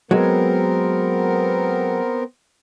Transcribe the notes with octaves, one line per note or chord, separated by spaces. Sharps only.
F#3 G#3 B3 C4 A#4